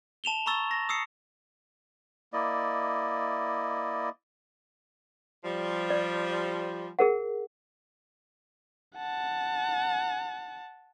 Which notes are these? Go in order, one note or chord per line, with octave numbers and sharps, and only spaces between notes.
A5 E7 F7 G7
A#5 B5 C#6 E6 A6
A#6
D#6 E6 C7 C#7
A#3 E4 D5 D#5
F3 G3
D5
G#4 A#4 F#5
F#5 A5